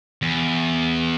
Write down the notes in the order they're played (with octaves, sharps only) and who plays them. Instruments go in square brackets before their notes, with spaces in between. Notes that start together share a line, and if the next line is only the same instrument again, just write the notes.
[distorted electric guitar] E2